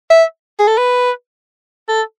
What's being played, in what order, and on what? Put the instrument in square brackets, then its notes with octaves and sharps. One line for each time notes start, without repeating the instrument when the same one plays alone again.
[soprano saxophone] E5
G#4
A4
B4
A4